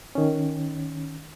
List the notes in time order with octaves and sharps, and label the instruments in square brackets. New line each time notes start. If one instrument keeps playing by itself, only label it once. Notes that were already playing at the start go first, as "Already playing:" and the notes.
[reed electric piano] D#3 C#4